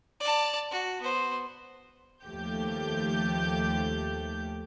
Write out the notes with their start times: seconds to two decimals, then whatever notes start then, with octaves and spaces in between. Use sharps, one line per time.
0.21 D5 A5
0.71 F#4
1.02 B3 C5
2.23 D#2 F3 A3 G4 G6